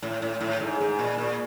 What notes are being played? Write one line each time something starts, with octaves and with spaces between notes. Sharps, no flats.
A2
A2
A2
G#2
G#2
A#2
A#2